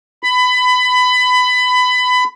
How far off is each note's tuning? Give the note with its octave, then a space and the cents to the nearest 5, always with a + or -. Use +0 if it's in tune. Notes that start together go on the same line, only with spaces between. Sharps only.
B5 +20